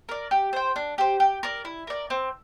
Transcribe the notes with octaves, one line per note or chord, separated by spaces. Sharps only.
A#4 D5
G4
C5 G5
D4
G4 C5
G4
A#4 D5
E4
A#4 D5
C4